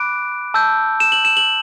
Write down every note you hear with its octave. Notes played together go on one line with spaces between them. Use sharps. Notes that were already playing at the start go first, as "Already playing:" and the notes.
Already playing: B5 D6 F#6 D7
A5 E6 G6
E7
F#7
E7
F#7